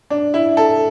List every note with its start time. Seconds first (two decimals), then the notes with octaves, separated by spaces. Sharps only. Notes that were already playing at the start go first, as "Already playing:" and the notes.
0.10 D4
0.34 E4
0.57 A4